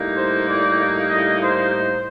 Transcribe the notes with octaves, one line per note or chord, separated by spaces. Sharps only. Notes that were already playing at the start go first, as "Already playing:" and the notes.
Already playing: A2 G3 A#3 D#4
C5
D5
D#5
C5